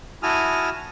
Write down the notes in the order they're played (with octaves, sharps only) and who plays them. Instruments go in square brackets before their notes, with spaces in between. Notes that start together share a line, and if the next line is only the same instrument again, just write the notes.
[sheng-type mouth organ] E4 F#4 G#5 A5 D#6 F6